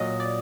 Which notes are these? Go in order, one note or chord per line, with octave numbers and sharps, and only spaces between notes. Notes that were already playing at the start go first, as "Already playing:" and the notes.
Already playing: A#2 F#3 D#5
D5